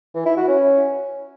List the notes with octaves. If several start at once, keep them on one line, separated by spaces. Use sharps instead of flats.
E3
E4
F#4
C#4